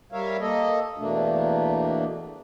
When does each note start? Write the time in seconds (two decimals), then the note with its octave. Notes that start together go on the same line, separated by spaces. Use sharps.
0.12 G3 A#4 C#5 E5 F5
0.40 A#3 A4 D#5
0.98 E2 B2 A3 A#3 D4